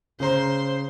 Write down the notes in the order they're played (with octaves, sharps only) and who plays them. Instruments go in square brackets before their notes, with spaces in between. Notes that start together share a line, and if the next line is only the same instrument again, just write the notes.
[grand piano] C#3 A#5 [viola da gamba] C5